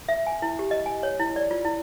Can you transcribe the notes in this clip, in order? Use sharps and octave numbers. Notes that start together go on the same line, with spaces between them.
E5
G#5
E4
G4
D#5
G#5
C#5
E4
D5
F4
E4